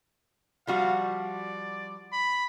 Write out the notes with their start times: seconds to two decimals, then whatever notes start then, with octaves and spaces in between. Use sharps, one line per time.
0.67 F3 G3 F#4 F5
1.04 D5
2.12 B5